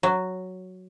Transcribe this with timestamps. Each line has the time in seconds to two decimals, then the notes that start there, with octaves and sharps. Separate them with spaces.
0.03 F#3